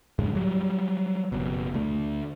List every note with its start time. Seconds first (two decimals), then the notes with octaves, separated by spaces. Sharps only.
0.19 F#2 A2 D3 G#3
0.35 F#3 G3
1.32 F#1 B2
1.74 D2 A3